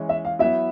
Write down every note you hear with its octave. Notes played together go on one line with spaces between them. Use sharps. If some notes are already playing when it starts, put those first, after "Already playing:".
Already playing: E3 G#3 C#4
E5
F5
F#3 B3 E4 E5